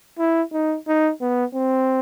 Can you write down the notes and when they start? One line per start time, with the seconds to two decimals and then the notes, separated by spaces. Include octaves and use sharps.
0.19 E4
0.53 D#4
0.88 D#4
1.21 B3
1.55 C4